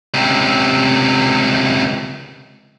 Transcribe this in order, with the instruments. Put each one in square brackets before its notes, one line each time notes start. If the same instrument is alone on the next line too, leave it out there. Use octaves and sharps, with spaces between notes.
[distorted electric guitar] C#2 C3